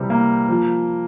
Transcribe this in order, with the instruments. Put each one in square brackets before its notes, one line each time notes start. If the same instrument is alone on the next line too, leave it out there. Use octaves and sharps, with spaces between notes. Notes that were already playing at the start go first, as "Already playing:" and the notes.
Already playing: [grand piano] C3 E3 G3
A#3
F3